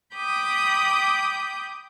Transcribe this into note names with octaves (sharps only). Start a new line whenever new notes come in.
G5 B5 D6 D#6 G6